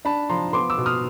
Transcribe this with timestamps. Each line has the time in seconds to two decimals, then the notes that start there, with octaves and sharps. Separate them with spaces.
0.05 D4 A5 B5
0.30 F3 A#5 C6
0.53 B3 C6 D6
0.70 D6 E6
0.78 B2
0.86 D#6 F6